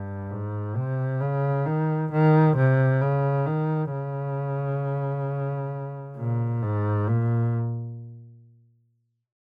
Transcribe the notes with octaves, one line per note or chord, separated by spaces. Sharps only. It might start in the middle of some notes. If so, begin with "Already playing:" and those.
Already playing: G2
G#2
C3
C#3
D#3
D#3
C3
C#3
D#3
C#3
A#2
G#2
A#2